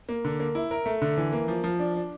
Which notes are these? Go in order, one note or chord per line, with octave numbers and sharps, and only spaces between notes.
A#3
D3
A#3
E4
A#4
A3
D3
E3
A#3
F3
F3
D4
D4